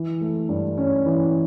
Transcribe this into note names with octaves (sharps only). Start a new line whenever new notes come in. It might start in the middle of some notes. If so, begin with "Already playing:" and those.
Already playing: E3
A3
G2
C#4
E3